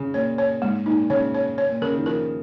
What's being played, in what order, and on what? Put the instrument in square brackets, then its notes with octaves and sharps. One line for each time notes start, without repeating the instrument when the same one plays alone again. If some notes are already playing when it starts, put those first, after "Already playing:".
Already playing: [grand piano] C#3
[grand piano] A#2 [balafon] C#5
[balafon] C#5
[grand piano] G#2 [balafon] A#3
[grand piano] A#2 [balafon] D#4
[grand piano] C#3 [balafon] C#5
[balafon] C#5
C#5
[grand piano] A#2
[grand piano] C#3 [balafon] A#4
[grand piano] D#3
[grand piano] F3 [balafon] A#4